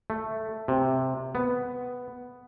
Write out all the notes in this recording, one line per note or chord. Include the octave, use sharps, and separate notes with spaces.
A3
C3
B3